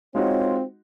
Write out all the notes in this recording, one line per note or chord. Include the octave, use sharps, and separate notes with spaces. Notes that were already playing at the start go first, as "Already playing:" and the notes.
G#3 C4 D#4 F4 F#4 C#5